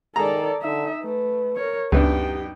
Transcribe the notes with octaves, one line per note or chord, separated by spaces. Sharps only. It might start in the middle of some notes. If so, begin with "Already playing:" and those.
D#3 G#4 A4 D5 A#5
D3 D#4 E5
A3 B4
A#4 C#5
C#2 F#2 B3 D4 D#4 G4 G5